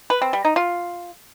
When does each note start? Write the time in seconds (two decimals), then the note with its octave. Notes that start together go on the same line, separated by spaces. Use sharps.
0.10 B4
0.22 C4
0.33 G3
0.45 D#4
0.56 F4